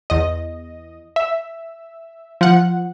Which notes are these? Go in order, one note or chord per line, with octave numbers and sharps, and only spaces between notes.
E2 D#5
E5
F3 F#5